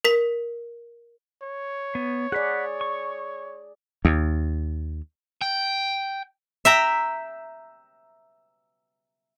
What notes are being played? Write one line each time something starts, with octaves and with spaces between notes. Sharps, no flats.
A#4 B6
C#5
B3
G#4 D5 F#5 B5
C#6
D#2
G5
E5 G5 A#5